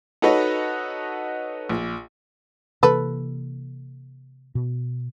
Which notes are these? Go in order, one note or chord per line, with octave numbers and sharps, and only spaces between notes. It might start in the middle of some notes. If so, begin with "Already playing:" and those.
D#4 F#4 A4 B4 C#5 D#5
A#1
C3 E3 A#3 A4 B4
B2